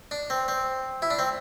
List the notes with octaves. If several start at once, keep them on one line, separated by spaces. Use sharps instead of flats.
D4
C4
C4
E4
D4
C4